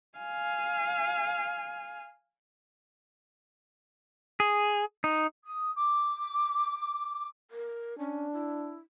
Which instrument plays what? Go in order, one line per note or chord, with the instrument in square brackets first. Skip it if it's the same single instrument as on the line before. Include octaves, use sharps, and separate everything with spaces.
[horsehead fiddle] F5 G#5
[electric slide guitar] G#4
D#4
[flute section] D#6
D6
[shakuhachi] A#4
[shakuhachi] C#4 [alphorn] D4
[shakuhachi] E4